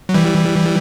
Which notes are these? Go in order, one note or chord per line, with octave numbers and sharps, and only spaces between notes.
F#3
E3 G3